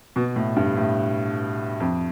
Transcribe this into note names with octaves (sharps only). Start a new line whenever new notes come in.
B2
A2
G2
A2
F2